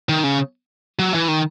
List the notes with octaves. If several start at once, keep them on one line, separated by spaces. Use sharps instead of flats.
D#3
C#3
F#3
E3
D#3